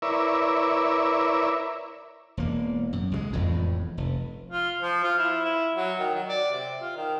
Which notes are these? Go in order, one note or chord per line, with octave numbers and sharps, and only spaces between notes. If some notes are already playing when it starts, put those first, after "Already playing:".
E4 A#4 B4 C#5 D5 E5
E1 A#3
F#2
C#2 F3 G#3
E1 F2 A2
F1
F4
F3
F4
E4
E4
F#3
D#3
F#3
D5
C3
F4
D#3